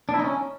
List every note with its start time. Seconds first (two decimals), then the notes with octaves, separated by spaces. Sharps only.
0.09 D4
0.14 E4
0.19 D#4
0.24 C#4